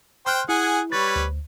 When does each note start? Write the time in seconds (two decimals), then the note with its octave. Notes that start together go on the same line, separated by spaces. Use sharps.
0.26 C5 G5 C6 F6 F#6
0.49 E4 G#4 F#5 G#5
0.92 G3 B4 C#5 C#6 A6
1.16 D2